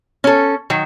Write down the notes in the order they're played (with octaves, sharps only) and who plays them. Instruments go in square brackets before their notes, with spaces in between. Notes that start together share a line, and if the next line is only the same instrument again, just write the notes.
[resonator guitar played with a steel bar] C#4 A4
D#3 F#3